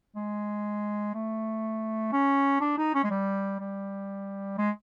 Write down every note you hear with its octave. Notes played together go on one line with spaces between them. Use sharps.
G#3
A3
C#4
D4
D#4
C#4
G#3
G3
G3
G#3